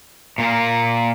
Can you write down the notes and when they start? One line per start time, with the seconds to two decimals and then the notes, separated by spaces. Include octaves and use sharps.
0.38 A#2 A#3